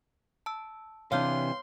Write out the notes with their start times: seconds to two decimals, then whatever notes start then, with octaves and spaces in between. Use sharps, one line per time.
0.46 A5 E6
1.12 C3 E3 D4 C#5 F5 C6 F6 G6